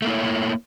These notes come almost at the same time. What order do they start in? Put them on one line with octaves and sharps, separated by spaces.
A3 A#3 E4 C#5